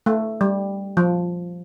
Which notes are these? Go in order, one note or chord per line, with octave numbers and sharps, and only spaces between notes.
A3
G3
F3